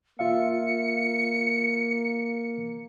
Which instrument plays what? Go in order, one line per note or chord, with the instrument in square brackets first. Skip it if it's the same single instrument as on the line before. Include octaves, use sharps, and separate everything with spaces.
[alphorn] A#3 [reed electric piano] F4 E5 F5 [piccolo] C#7